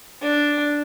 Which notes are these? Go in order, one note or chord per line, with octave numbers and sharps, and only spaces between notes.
D4